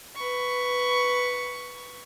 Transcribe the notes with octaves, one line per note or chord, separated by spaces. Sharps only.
B4 C#6